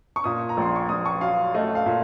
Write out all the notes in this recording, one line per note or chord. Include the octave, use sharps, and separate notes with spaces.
C#6
A#2 D#6
A#5
A#1 C6
C#6
A#1 D#6
C#6
F#3 F5
A3 D#5
F5
A#2